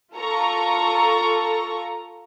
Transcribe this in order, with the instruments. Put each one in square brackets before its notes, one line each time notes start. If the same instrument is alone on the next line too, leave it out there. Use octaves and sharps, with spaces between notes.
[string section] F4 A4 A#5 C#6